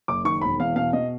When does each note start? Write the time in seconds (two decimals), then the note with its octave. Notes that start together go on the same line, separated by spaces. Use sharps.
0.08 F#1 D6
0.25 D#3 C#6
0.41 E1 B5
0.60 E2 F5
0.76 B2 F5
0.93 B2 D#5